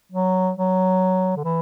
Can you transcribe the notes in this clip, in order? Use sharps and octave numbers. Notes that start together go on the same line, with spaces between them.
F#3
F#3
D3
E3